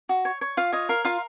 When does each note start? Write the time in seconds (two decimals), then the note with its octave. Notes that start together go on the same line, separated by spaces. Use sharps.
0.09 F#4
0.25 C#5
0.41 C#5
0.57 F4 F5
0.73 C#5 D#5
0.89 A#4 F5
1.05 F4 F5